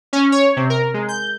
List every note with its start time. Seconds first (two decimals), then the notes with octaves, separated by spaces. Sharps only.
0.13 C#4
0.32 C#5
0.57 C3
0.70 A#4
0.94 G#3
1.08 G6